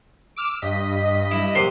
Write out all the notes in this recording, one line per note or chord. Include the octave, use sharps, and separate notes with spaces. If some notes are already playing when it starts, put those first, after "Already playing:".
D6 E6 F6
G2 D#5 B6
E4
A#1 C3 C6